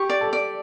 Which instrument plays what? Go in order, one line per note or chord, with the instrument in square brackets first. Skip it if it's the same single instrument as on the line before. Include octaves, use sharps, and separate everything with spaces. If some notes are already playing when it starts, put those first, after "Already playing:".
Already playing: [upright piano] G4 [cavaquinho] C#6
[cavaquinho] D5
[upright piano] A4
[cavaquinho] D5